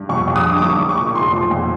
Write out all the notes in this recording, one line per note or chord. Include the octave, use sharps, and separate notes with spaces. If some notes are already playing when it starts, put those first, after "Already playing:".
Already playing: G2
F2 C#6
F2
D#6
D3 D6
D6
B1 C#6
B1
C#6
A#2
F1 C6
F3
F2